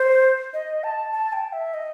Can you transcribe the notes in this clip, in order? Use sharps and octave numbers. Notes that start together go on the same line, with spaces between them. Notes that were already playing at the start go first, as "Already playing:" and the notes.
Already playing: C5
D#5
A5
A5
G5
E5
D#5